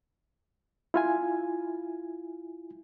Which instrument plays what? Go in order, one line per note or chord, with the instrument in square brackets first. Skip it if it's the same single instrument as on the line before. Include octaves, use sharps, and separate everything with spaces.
[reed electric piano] E4 F4 G#5